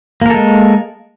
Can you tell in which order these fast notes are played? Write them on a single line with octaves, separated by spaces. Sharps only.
A#3 A#4 A4 G#3